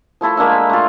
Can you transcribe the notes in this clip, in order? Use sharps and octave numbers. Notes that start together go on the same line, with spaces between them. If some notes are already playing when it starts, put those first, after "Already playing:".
F3 A3 E4 A4
G#3 A#3 D4 E5
A3 F4